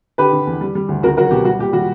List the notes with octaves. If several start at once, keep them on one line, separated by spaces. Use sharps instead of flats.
D3 G4 B4
D3
E2
G3
G3
D2
C#2 F#4 A#4
F#3 F#4 A#4
B2 G4
G3 F#4
A#2 G4
G3 F#4